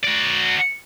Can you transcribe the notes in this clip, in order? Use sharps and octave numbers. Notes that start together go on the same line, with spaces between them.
F#4 D5